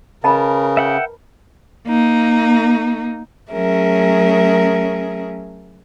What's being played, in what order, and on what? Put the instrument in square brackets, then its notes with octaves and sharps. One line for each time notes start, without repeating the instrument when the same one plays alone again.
[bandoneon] C#3 [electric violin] A#4 B4 [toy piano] D#5 A5 B5
[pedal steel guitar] E5 F#5 G5
[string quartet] A#3 D#4
F#3 A3 C#4 G#4 A#4 E5